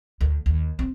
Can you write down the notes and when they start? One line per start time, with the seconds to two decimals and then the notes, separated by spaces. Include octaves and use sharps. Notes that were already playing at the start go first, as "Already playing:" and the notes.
0.21 D2
0.46 D#2
0.79 C4